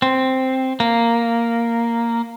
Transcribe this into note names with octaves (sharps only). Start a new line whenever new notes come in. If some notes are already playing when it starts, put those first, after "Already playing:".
C4
A#3